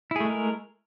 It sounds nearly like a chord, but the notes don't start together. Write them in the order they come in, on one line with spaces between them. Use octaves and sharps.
E4 G#4 A3 G#3 A#4